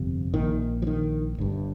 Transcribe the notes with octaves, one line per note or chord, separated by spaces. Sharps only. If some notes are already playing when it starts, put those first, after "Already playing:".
Already playing: G1 F2 C3
A#1 A#2 D#3
F3
D#3
G1 G2